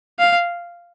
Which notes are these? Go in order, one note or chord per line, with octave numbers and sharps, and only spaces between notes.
F5